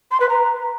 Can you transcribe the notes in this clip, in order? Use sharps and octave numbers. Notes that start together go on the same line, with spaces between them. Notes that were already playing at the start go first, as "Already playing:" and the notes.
C6
B4
A#5